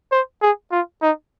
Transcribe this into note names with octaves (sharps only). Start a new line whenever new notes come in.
C5
G#4
F4
D#4